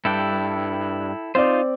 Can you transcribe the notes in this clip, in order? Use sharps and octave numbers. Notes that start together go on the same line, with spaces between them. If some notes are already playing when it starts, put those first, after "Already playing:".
G2 E4 A4 G5
C4 D#4 F4 C5 D5